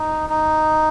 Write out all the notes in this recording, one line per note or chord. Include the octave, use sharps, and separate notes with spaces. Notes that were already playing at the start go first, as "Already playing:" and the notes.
Already playing: D#4
D#4